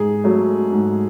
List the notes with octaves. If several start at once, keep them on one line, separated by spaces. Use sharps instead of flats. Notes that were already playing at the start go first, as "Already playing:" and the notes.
Already playing: G#2 G#4
F#3 A3
G#2